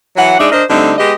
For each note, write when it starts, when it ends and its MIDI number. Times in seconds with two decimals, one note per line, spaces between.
0.17 0.36 52
0.17 0.36 54
0.17 0.36 78
0.39 0.49 56
0.39 0.49 62
0.39 0.49 63
0.39 0.49 74
0.39 0.49 76
0.52 0.63 62
0.52 0.63 70
0.52 0.63 72
0.52 0.63 75
0.70 0.93 50
0.70 0.93 55
0.70 0.93 57
0.70 0.93 60
0.70 0.93 63
0.98 1.13 56
0.98 1.13 59
0.98 1.13 67
0.98 1.13 75